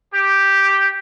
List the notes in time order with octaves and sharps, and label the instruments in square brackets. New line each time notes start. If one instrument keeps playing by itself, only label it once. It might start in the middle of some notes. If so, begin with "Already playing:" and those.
[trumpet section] G4